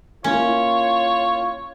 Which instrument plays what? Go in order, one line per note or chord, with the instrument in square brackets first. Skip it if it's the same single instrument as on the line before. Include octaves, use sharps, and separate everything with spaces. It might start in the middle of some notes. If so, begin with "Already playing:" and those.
[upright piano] A#3 E4 A#4 [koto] C#4 [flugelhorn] F4 [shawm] C#5